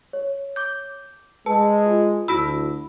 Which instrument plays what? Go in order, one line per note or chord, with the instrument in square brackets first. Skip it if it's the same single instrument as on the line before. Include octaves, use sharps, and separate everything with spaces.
[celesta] C#5
[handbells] D6 G6
[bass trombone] G#3 [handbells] B4 [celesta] A5
[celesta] F4
[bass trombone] D2 [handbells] E4 F#4 E6 [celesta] B5